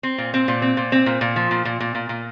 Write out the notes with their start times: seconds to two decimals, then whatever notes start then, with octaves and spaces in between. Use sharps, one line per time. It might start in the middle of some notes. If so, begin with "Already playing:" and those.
0.03 C4
0.18 A#2
0.34 C4
0.48 A#2
0.62 C4
0.77 A#2
0.92 C4
1.06 A#2
1.21 A#2
1.36 F3
1.51 A#2
1.65 A#2
1.80 A#2
1.95 A#2
2.09 A#2